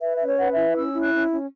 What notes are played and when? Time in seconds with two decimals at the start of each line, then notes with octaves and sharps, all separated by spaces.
0.02 B4 E5
0.16 C#4 E5
0.26 C#5
0.39 B4 F#5
0.52 E5
0.57 E4
0.75 C#4 E6
0.94 E4
1.00 F#6
1.12 C#4
1.31 C#4